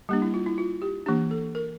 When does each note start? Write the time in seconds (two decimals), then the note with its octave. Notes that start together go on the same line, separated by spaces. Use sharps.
0.09 G3 A#3 D4 G4
0.22 E4
0.34 F4
0.46 E4
0.58 F4
0.82 G4
1.06 E3 A#3 D4 G4
1.31 A4
1.55 A#4